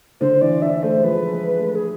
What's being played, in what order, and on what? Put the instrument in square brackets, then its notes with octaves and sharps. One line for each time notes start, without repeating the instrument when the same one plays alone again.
[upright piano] D3 [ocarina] C5
[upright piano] E3 [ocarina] D5
[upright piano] D4 [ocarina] E5
[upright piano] A3 [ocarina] C5
[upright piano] G#3
[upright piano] F3 [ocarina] B4
[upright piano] G#3
A3
[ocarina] G#4